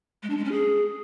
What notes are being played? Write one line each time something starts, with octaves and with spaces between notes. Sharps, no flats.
G#3
D4
G#3
C#4
G#4